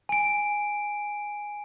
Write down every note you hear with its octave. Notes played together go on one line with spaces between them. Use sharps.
G#5 D7